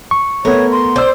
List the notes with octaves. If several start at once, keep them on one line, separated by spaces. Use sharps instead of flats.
C#6
A3 B3 A#4 C#5
C6
C5 D5 E6